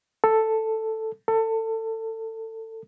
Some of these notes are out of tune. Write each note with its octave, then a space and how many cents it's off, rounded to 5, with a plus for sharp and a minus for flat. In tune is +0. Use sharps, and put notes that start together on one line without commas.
A4 +5
A4 +25